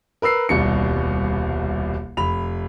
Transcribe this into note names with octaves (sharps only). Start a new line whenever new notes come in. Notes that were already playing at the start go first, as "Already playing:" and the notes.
A#4 B4 E6 C7
D#1 C2 B2 C#7
F1 B5 F7